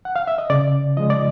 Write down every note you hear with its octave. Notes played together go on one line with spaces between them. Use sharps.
F#5
F5
E5
D#5
C#3 D5
F3 G#3 D#5
D5